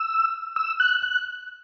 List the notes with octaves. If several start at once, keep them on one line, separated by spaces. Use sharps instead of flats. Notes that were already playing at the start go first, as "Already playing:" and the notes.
Already playing: E6
E6
F#6
F#6